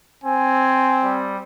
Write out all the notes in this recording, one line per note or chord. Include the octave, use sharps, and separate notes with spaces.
C4 G#5
G3